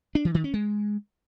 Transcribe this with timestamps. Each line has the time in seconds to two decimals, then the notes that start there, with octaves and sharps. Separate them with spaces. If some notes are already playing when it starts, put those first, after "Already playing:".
0.15 D4
0.25 E3
0.34 D#3
0.44 C#4
0.54 G#3